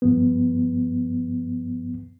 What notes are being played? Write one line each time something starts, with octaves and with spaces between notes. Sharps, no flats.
G2 F3 B3